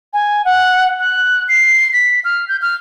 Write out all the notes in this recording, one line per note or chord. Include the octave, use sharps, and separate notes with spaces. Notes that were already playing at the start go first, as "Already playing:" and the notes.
G#5
F#5
F#6
C7
B6
F6
G6
F6